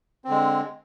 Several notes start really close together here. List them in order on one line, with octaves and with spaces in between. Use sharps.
C4 D3 G#3